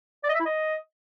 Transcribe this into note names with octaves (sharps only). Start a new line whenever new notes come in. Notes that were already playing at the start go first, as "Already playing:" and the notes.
D5
D#5
E5
E4
D#5